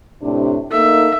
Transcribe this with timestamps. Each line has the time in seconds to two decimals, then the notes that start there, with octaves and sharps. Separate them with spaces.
0.23 A2 C3 D4
0.71 A#3 D#4 A4 E5